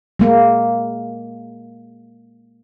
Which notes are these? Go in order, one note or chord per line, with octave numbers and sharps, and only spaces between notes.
G#3 A#3